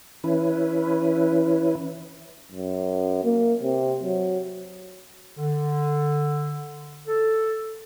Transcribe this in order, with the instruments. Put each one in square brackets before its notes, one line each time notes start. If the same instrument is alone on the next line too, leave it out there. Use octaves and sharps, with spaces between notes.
[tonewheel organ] E3 C#4 E4 B4
[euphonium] F#2
A#3
C3
F#3
[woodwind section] D3
A4